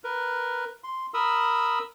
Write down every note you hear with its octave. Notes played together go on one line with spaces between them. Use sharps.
A#4 B4
C6
A#4 B5 D#6 E6